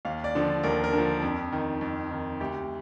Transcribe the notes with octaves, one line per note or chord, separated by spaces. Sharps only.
D#2 F5
D5
D3 F3
D#2 A#4
A#4
D3
F3
F2
D#3
F2
D#3
D2 G4